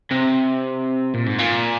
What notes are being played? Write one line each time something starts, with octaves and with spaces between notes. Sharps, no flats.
C3
A#2
G#2
A#2